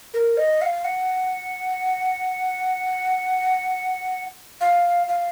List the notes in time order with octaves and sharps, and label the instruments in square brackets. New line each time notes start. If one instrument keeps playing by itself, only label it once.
[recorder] A#4
D#5
F#5
F5
F#5
F5
F5